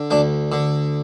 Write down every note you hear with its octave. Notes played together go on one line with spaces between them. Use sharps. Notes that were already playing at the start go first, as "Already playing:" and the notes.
Already playing: D3
D2 D4
D3